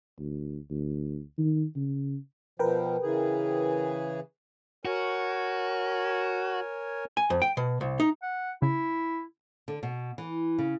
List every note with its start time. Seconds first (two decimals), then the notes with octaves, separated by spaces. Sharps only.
0.19 D2
0.70 D2
1.38 D#3
1.76 C#3
2.59 B2 F3 A#4 B4 G5
3.03 C#3 E3 G#4
4.85 F#4 A#4 C#5 G#5
7.17 G#5
7.30 F2
7.42 G5
7.57 B2
7.81 C2
8.00 D#4
8.22 F#5
8.62 C#3 E4
9.68 D3
9.83 B2
10.18 E3
10.58 C#3